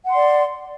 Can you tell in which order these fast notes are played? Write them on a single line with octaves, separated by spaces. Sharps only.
F#5 C6 D5